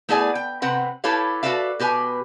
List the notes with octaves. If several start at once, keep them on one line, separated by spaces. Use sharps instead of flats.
A3 B3 E4 G#4 D5 G#5
G5
C3 C4 B4 F#5
E4 G4 A4 B4 C#5 F5
F#4 A4 B4 D5 E5 F5
B2 G4 B4 G#5